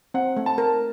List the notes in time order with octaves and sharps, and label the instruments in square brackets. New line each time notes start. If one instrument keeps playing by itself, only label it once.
[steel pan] C4 [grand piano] F#5
[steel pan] A3
[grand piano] A5
[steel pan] A#4